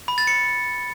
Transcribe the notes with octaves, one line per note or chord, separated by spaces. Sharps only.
B5
A6
C#7